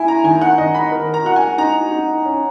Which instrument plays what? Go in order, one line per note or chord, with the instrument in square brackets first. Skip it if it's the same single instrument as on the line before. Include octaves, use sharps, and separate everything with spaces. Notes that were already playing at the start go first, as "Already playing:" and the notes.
Already playing: [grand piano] E4 [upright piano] G#5
[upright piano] A#5
[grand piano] D#3 [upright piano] G#5
[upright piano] F#5
[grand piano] D#3 [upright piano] D#5
[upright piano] B5
[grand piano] A#4
[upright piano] A#5
[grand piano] F#4 [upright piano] F#5
[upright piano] G#5
[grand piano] D#4 [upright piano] A#5
[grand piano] D#4
C#4